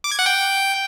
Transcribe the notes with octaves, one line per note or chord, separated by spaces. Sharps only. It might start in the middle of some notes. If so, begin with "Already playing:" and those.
D6
G#6
F#5
G5